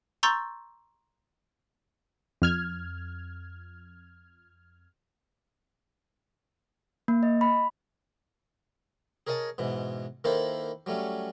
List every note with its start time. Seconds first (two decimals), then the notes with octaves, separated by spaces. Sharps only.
0.23 A#5 C6 C#6 E6 G6 A6
2.42 F2 F6 G#6
7.08 A#3
7.23 D#5
7.41 B5
9.27 G#4 A#4 C#5 D#5 G#5 A5
9.58 G#2 B2 E3
10.24 D#3 A#3 E4 A4 B4 C5
10.86 F#3 G3 A3 C#4